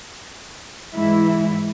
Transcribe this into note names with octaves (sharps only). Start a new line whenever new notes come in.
G#2 E3 G#3 E4